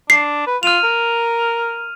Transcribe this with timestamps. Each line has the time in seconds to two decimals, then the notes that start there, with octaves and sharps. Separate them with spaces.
0.10 D4 C7
0.47 B4
0.63 F4 F6 D#7 F7
0.84 A#4